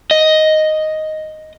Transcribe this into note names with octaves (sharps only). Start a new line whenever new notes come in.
D#5